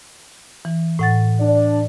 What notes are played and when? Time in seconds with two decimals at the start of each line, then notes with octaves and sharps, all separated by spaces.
0.65 E3
0.99 A2 F#5 A6
1.40 D4 D5